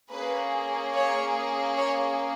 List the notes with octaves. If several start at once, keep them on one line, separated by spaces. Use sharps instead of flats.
A#3 C#4 G#4 B4
C#5
C#5